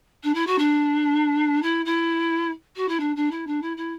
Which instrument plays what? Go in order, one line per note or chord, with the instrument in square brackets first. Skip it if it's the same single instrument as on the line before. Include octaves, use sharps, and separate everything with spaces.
[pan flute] D4
E4
F#4
D4
E4
E4
F#4
E4
D4
D4
E4
D4
E4
E4